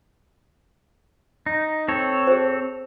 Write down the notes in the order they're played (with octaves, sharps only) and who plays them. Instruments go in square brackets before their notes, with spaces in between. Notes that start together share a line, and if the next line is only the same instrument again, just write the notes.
[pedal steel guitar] D#4
C4 A4 C#5
[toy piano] G#4 C5